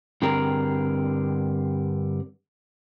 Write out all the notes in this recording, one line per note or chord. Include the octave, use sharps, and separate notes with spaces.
G2 D3 C4 G#4 A#4 A#5